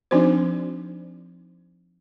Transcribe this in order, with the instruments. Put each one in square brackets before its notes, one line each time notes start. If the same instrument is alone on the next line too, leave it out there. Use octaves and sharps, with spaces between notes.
[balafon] F3 C4 D4 D#4 F#4 C5